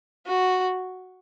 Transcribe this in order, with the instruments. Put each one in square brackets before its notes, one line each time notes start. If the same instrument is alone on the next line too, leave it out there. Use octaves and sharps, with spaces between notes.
[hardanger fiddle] F#4